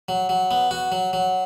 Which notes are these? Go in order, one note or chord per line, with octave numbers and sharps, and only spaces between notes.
F#3
F#3
B3
F#4
F#3
F#3